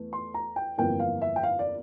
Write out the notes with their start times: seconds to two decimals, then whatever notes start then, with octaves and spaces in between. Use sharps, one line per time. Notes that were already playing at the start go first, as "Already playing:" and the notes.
Already playing: E2 E3 A3
0.13 C6
0.34 A#5
0.56 G5
0.78 G1 F2 E3 A#3 G5
1.00 F5
1.22 E5
1.36 G5
1.43 F5
1.59 D5